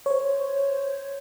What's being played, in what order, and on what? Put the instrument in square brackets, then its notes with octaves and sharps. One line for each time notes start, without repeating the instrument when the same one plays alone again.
[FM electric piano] C5 C#5